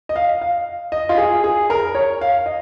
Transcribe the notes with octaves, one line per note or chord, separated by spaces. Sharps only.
D#5
F5
F5
D#5
F4
G#4
G#4
A#4
C#5
F5
D#5